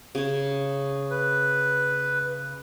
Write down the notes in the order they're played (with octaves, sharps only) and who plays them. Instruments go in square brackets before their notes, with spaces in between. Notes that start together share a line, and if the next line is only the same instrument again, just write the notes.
[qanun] C#3 C#5
[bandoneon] B4